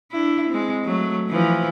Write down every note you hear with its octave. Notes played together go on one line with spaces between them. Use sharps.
D4 E4
G#3 C4
F#3 A3
E3 F3